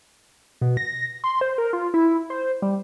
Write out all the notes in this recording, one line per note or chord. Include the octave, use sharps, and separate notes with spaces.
B2
A#6
C6
C5
A#4
F4
E4
C5
G3